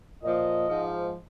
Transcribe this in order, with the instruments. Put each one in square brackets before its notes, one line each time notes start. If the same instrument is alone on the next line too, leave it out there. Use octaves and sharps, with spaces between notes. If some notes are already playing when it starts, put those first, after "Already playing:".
[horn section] A#2 F3 D#5
G#2 F3